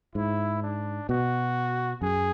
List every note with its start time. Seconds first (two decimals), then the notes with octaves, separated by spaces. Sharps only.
0.15 G#2 E4
0.62 D4
1.09 B2 F#4
2.02 F#2 G#4